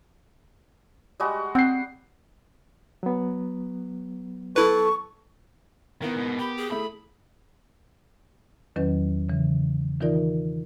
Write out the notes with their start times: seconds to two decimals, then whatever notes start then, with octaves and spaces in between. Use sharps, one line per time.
1.20 G3 G#3 F#4
1.55 C4 F#5 G5 C7
3.03 F#3 B3
4.56 E4 A4 B4 C#6
6.02 D#3 B3 E4 A#4
6.16 G#2 B2
6.39 G4 B5
6.57 G#4
6.71 A3 E4 B5
8.76 E2 D#3 F#3 C#4 B4
9.29 C#3 E3
10.01 D#3 E3 D#4 F4 A#4 D5